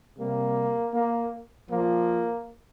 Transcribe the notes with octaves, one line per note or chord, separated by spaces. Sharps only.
C3 G3 A#3
A#3
A#2 F3 A#3